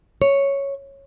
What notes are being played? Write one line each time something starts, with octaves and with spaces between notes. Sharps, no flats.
C#5